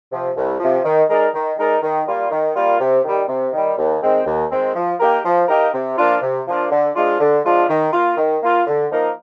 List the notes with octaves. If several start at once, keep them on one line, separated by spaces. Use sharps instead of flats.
C3 F3
C2
C3 F3
D#3
G#3 D#4 A#4 D5
D#3
G#3 D#4 A#4 D5
D#3
G3 A#3 F4
D#3
G3 A#3 F4
C3
D#3 G3
C3
D#3 G3
D#2
D#3 G#3 C4
D#2
D#3 G#3 C4
F3
A#3 D#4 G4 A#4
F3
A#3 D#4 G4 A#4
C3
F3 A#3 D4 F4
C3
F3 A#3 D4 F4
D3
F3 G#3 D4 F4
D3
F3 G#3 D4 F4
D#3
A#3 F4
D#3
A#3 F4
D3
F3 A#3 D#4 A#4